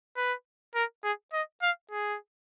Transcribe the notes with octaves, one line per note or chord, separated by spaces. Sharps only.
B4
A#4
G#4
D#5
F5
G#4